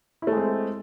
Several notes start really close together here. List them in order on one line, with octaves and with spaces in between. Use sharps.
E4 A3 G#3 C4